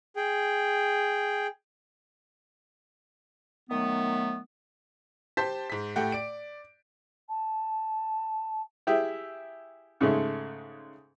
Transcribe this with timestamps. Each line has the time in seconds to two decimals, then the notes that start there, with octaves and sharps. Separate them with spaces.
0.16 G#4 G5
3.70 D#3 F#3 A3 B3
5.37 G4 C5 A5 C6 G6 B6
5.70 G#2 B6
5.96 A2 A3 G4 F#5 G5
6.12 D5 D7
7.28 A5
8.87 E4 G4 G#4 E5
10.01 G#2 C#3 G#3 A3